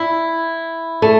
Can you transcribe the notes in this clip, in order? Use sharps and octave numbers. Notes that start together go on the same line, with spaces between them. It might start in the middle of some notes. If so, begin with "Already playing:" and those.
Already playing: E4
A3